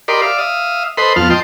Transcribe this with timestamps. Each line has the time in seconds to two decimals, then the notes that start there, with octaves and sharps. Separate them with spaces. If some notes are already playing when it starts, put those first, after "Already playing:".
0.08 G4 A#4 D5 D#5 B5 C6
0.22 D5 E5 F5
0.38 E5 F5 D#6
0.97 A4 B4 C5 D#5 B5 C6
1.16 F2 B3 F4 A5 F6
1.30 D#5 G5 A5 C6